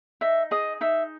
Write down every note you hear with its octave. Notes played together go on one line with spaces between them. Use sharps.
D#4 E5
G#4 D#5
D#4 E5